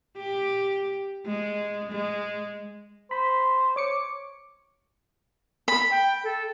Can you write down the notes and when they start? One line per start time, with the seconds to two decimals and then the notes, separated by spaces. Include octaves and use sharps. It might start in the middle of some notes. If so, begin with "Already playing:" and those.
0.17 G4
1.26 G#3
1.92 G#3
3.11 C5 B5
3.76 C#5 D6 C#7
5.68 B5
5.91 G5
6.24 A4